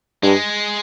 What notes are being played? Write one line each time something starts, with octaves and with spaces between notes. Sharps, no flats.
G2 G#3